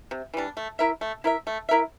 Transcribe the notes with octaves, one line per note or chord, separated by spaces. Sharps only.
C3
E3 G3 D4
A3
E4 A#4 E5
A3
E4 A#4 E5
A3
E4 A#4 E5